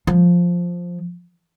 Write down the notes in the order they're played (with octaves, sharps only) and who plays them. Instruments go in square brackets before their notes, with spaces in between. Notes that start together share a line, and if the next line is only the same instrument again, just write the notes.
[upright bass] F3